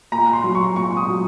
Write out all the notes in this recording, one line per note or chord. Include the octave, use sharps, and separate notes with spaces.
A#2 A#5
C6
F#3
C#6
A#2 C#6
D#6
F#3